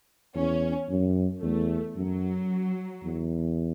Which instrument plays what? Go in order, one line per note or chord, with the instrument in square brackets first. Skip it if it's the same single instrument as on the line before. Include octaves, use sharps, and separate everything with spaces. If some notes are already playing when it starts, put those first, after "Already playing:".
[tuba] E2 [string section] C#4
[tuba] F#2
[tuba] E2 [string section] A3
[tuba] F#2 [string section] F#3
[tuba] E2